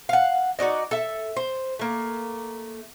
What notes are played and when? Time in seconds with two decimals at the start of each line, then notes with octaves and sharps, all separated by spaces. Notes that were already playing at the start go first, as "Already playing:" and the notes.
0.09 F5 F#5
0.59 D#4 F#4 D5 D#5
0.91 A4 E5
1.36 C5
1.79 A3 A#3